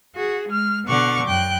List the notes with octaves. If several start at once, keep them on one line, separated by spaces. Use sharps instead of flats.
F#4 G#4
G#3 F6
B2 D3 F#5 C#6 D6 F6
F#2 G5 F#6